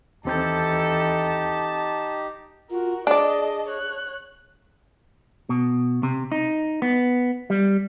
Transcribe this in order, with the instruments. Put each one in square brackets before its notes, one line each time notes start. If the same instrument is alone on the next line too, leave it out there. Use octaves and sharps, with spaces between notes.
[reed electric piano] D#2 C4 G6 [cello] E3 A4 [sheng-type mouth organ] D#4 G4 [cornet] A5
[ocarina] F4 [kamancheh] F#4 A#4
[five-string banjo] D4 D5 [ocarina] G#4 [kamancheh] D#5 A5
[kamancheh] C#5 F#6
[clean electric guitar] B2
C3
D#4
B3
G3